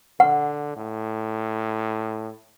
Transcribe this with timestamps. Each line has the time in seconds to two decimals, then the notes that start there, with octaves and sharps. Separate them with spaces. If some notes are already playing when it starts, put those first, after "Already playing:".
0.20 D3 F#5
0.76 A2